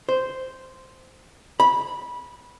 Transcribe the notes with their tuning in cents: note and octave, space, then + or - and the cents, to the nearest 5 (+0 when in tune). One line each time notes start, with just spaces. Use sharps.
C5 -5
B5 -20